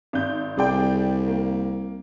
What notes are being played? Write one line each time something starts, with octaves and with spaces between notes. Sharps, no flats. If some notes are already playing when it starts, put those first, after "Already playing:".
G#1 G6
C2 G#4 D5 G5
A#3